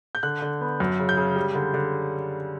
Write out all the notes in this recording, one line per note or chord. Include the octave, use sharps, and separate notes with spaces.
G6
D3 F#6
D3
B3
F#2
C#3
G6
C#3
G3
D3
D3